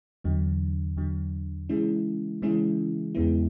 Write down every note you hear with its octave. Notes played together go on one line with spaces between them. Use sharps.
E2 D3 F#3
E2 D3 F#3
C#3 E3 G#3 C#4 E4
C#3 E3 G#3 C#4 E4
E2 C#3 G#3 B3 E4